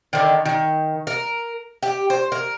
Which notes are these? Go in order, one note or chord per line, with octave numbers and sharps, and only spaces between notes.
D3 D#3
D#3
A#4
G4
C5
A#4